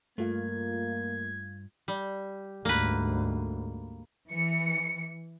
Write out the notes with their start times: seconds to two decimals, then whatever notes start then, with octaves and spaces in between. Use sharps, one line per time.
0.18 G2 A3 A#3 F4 F5 G#6
1.88 G3
2.65 D2 G#2 A#3 B4
4.30 E3 C#7